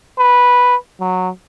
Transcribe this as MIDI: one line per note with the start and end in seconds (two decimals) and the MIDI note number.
0.19 0.76 71
1.00 1.29 54